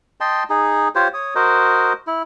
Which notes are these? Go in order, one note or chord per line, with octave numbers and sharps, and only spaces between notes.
D#5 G5 A5 C6
D#4 G#4
F4 G4 C5 C#5
C#5 D#6
F#4 A#4 C5 D#5
E4